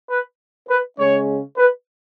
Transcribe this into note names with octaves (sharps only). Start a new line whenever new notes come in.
B4
B4
C#3 G#3 C#4 C#5
B4